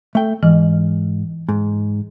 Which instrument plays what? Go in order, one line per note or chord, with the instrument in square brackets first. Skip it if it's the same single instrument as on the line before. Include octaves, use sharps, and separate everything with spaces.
[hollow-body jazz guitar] A3 G5
[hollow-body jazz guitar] G#2 [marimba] E3
[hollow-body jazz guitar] G#2